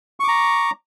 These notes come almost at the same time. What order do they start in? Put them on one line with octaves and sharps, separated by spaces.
C#6 D6 A#5